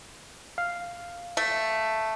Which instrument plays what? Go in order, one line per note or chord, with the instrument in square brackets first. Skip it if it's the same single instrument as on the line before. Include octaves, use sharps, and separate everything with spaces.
[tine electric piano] F5
[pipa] A3